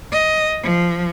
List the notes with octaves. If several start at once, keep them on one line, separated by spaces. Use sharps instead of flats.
D#5
F3